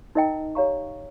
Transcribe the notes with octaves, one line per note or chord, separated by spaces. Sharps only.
D#4 A#4 D#5 G5 A#5
G4 C#5 F5 A#5 C#6